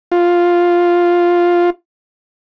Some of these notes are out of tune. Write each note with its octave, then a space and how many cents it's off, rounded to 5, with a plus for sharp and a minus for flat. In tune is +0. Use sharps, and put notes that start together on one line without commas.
F4 +0